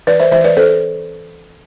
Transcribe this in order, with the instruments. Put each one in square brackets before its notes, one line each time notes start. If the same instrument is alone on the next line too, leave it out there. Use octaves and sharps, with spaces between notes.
[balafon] E3 B4 D5
C5 E5
E3 C5 E5
B4 D5
C4 A4 C5